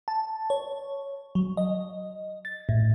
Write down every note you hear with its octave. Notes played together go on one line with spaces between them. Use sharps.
A5
C#5
F#3
D#5
A6
A2